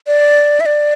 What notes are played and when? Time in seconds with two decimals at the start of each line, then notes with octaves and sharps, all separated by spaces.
0.07 D5
0.60 E5
0.66 D5